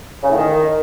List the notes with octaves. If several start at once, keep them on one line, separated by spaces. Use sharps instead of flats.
C#3
A2
D#3